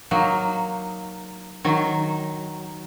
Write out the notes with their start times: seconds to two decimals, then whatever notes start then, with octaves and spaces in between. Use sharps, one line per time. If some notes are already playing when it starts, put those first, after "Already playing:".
0.11 F#3 A#3 D#4
1.64 D#3 F#3